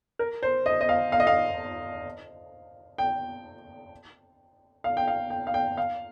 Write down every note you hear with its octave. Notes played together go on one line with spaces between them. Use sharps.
A#4
C5
D#5
D#5
F5
F5
D#5
F5
G5
F5
G5
F5
G5
F5
G5
F5